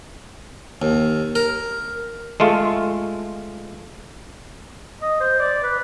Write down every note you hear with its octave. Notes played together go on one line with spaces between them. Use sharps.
D#2
A#4
G#3 A3 F4
D#5
C5
D5
B4